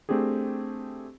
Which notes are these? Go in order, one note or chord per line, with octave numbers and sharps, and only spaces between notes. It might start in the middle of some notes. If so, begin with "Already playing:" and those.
A3 C4 D4 G4 G#4